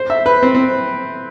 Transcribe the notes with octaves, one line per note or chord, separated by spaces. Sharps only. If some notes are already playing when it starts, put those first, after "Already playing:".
Already playing: C5
E5
B4
C4
C4